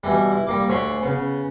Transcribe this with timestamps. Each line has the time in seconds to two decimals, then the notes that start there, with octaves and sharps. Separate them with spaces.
0.04 B2 E3 G3
0.32 E4
0.47 G3 A#3 D6
0.68 D2 C#5 G#5 B5 C6 D6
1.03 C#3 B3